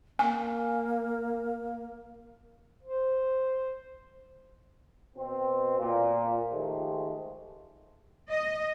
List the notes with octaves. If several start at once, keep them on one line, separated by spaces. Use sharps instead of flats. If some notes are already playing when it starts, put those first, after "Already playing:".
A#3 G#5
C5
B2 C4
A#2
D#3 F3 G#3 A3 G4
D#5